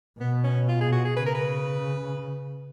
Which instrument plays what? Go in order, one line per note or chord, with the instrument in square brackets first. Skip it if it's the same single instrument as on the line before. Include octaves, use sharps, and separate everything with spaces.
[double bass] B2 [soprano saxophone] B3
[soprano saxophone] C#4
F4
G#4
F#4
G#4
[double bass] C#3 [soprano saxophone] B4
[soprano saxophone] A#4
B4